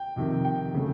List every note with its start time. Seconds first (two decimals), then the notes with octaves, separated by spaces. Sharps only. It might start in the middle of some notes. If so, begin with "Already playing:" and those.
Already playing: G5
0.16 F2 C3 D#3
0.45 G5
0.74 C#3 F#3 A3